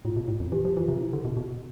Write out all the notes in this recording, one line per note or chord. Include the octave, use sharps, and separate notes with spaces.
A2 F4
B2
A2
F2
E3 G4
F3 G4
E3 F4
C3 F4
E4
D3
B2
B2